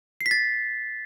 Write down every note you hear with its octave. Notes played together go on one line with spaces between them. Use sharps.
C7
B6
A6